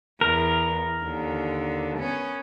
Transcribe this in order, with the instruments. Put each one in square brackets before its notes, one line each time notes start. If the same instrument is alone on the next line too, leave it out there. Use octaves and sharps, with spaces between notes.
[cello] E2 [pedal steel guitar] A#4
[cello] D#2 D3
B3 C#4